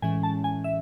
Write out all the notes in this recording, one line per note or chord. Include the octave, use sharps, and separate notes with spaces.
A2 E3 G#3 C#4 G#5
A5
G#5
E5